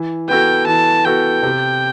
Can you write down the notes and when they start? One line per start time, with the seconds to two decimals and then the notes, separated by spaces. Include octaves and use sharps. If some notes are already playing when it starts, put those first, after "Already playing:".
Already playing: E3
0.28 B3 F#4 A4 G5
0.67 E3 A5
1.05 B3 F#4 A4 G5
1.43 C3